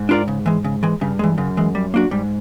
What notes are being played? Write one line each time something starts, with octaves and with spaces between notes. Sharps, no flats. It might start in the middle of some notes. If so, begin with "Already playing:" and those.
Already playing: G#2
D4 F4 A#4 D5
C#3
E3 G#3
C#3
E3 G#3
G2 C#3
E3 G#3
F#2 C#3
E3 G#3
G3
A#3 D4 F#4
G#2 G3